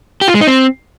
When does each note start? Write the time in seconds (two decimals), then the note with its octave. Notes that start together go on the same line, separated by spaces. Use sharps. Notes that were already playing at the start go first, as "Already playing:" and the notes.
0.21 G4
0.28 F4
0.34 G#3
0.41 D#4
0.47 C4